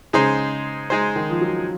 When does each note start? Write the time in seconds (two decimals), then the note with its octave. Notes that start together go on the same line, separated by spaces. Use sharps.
0.13 C#3 G#3 D#4 G#4 C5
0.90 G#3 D#4 G#4 C5
1.16 D#3
1.30 F3
1.41 F#3